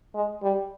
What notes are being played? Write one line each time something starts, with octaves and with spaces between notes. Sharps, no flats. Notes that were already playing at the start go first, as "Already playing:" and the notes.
G#3
G3